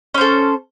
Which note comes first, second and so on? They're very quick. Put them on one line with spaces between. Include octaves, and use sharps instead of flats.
C#4 C5 A4